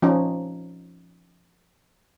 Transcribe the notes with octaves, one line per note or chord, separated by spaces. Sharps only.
F3 C#4 D#4